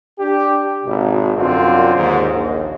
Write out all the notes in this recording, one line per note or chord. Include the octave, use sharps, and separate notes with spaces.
D4 G4
G#1 B2
C2 F#2 D3 C4 F4 F#4
D#2 G#2
A#1 D#2